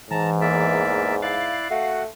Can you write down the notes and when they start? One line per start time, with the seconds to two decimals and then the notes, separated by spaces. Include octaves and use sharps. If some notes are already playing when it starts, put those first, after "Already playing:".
0.11 G#2 E3 A5 A#5
0.41 E2 A#3 D5 E5
1.22 E4 D5 F5 F#6
1.71 A3 F#4 F#5